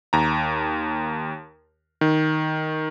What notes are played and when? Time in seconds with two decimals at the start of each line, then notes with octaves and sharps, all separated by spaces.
0.13 D#2 A#5
2.01 D#3